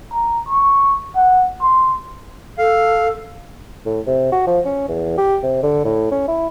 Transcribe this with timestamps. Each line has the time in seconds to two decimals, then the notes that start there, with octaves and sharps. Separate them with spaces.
0.12 A#5
0.48 C#6
1.16 F#5
1.62 C6
2.59 A4 F5
3.86 A2
4.06 C3
4.32 F#4
4.47 F3
4.66 C#4
4.88 E2
5.18 G4
5.43 C3
5.63 D3
5.84 A2
6.11 C#4
6.28 E4